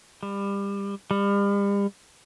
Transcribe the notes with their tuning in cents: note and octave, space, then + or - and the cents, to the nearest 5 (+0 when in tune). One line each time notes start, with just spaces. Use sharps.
G3 +25
G3 +40